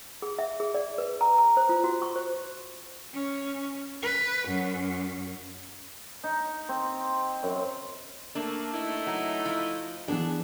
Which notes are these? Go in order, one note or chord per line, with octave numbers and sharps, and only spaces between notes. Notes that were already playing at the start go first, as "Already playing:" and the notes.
G#4
E5
G#4
D5
B4
A#5
A#5
C5
F4
F#4
C#6
C5
C#4
B4
F#2
D#4
C4
F#2
A3 A#3 D4
A3 D#4 E4
F#3
F3
E3 B3 D4 G#4